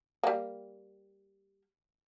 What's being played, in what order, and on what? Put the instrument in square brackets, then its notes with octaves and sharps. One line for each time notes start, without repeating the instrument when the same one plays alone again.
[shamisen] G3 A#3